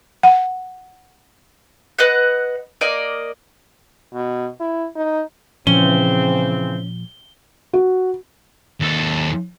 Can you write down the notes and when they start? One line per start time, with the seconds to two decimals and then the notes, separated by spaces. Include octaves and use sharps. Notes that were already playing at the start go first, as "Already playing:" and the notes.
0.23 F#5
1.99 B4 D#5 F#5
2.81 A#3 D5 D#5
4.14 B2
4.60 E4
4.96 D#4
5.67 A#2 C#3 E3 F3 C4 C#4 G7
7.73 F#4
8.81 D#2 A4